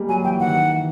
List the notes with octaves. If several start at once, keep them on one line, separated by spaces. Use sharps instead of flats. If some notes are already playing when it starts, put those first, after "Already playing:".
Already playing: G3 G#3 A#3
F#3 G#5
E3 G5
D#3 F#5
D#3
E3